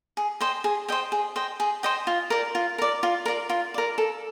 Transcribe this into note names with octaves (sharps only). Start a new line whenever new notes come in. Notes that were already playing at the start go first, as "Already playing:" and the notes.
G#4
C5 D#5 G5
G#4
C5 D#5 G5
G#4
C5 D#5 G5
G#4
C5 D#5 G5
F4
A#4 D5
F4
A#4 D5
F4
A#4 D5
F4
A#4 D5
A4